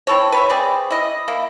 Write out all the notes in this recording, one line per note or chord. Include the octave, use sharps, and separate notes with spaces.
C4 E4 A4 C#5
B4 C#5 E5
C4 G#4 D5
E4 D#5
A#3 E4